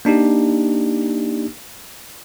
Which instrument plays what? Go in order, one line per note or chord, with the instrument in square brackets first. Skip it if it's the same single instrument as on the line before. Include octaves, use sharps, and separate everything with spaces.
[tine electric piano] A#3 D4 D#4 G4